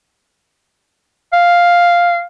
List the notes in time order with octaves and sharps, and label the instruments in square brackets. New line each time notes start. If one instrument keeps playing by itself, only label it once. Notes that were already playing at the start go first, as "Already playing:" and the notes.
[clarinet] F5